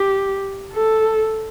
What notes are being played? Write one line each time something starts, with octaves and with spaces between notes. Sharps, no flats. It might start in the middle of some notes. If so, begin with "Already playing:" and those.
Already playing: G4
A4